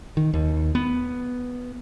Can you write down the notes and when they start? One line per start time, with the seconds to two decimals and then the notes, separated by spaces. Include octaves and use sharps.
0.17 D#3
0.33 D#2
0.75 B3